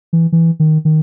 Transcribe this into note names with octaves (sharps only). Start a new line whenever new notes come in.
E3
E3
D#3
D#3